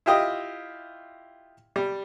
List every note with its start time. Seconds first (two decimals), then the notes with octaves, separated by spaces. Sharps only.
0.06 E4 F4 G4 D#5
1.76 G3